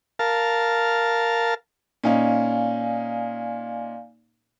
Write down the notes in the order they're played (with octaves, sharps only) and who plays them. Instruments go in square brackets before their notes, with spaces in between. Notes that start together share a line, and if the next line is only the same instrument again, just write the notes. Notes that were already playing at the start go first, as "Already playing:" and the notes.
[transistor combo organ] A#4 F5 A5
[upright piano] A#2 C#4 D#4 [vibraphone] D5 F5 G#5